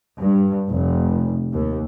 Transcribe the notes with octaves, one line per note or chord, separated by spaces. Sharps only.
G2
F1
D#2